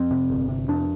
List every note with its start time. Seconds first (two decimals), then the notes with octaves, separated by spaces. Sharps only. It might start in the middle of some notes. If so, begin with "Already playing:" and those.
Already playing: F2 C4
0.11 C3
0.30 G1
0.49 C3
0.68 F2 D4